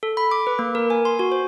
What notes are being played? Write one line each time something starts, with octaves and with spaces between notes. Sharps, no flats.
A4
B5
D6
B4
A#3
A#4
G#5
C6
F#4
C5